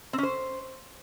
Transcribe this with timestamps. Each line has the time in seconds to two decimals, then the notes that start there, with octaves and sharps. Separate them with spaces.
0.13 C4
0.18 C#4
0.23 C5